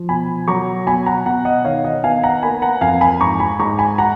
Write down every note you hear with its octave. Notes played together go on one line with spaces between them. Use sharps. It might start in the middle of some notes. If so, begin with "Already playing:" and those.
Already playing: F3
B2 G#5 B5
F#3 A#5 C#6
B2 G#5 B5
F#5 A#5
B2 F#5 A#5
D#5 F#5
D#3 C#5 F5
D#5 F#5
B3 F5 G#5
F#5 A#5
A#3 G#5 B5
F#5 A#5
F2 F5 G#5
G#5 B5
G#2 A#5 C#6
G#5 B5
G#2 A#5 C#6
G#5 B5
F#5 A#5